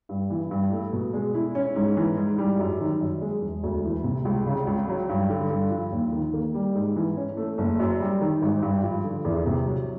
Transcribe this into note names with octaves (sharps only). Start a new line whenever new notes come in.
G2
E3
G2
A3
B2
G#3
E4
C#4
G#2
E3
G#2
G3
F#2
D#3
F#2
G#3
E1
D2
E3
C3
C#2
C#3
C#2
F#3
G2
D3
G2
F3
D#2
D#3
A#3
G3
G#2
E3
C#4
A3
F#1
F#2
G3
D#3
G#1
G2
F3
D3
E2
C3
F#3